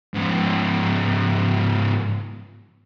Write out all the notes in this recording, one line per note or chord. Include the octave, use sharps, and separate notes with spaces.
G#2 F3